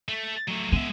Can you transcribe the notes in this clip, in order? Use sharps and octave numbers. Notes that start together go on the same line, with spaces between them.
A3
F#3 A3
G#3 B3 E5